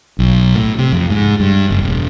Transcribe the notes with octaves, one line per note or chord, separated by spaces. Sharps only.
B1
A2
C3
F2
G#2
G2
F#1
E1